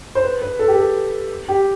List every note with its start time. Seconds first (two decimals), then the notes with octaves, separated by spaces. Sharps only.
0.15 C5
0.24 B4
0.42 B4
0.59 A4
0.68 G4
0.77 A4
1.48 G4